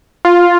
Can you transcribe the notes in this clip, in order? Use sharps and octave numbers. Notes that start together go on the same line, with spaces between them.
F4